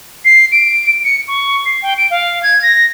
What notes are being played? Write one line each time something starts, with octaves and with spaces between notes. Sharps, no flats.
C7
D7
C#7
C#6
C7
G5
D7
F5
G#6
A#6